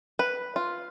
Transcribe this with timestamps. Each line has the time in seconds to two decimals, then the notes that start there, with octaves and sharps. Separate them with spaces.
0.19 B4
0.56 F4